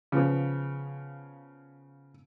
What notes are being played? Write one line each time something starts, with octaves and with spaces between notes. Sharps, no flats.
C#3 F3 B3